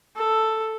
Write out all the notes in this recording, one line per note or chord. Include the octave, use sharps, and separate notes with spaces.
A4